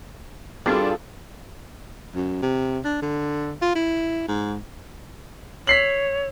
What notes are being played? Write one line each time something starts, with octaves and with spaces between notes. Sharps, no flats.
G2 G3 C4 D4 F4 F#4 G#4 A4
F#2
C3
D4
D3
F4
E4
G#2
C#5 B6 C7 F#7